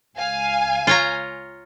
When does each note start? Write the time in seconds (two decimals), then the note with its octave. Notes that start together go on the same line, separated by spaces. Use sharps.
0.16 C#2 F5 G#5
0.87 F4 C#5 A#5